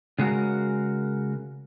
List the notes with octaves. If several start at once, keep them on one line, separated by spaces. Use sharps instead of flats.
C#3 G#3 F#4 A#4